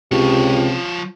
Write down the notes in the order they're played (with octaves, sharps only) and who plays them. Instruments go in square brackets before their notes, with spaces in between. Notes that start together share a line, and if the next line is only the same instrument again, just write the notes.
[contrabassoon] C#2 [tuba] C3 [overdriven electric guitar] F3 C#5 [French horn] G4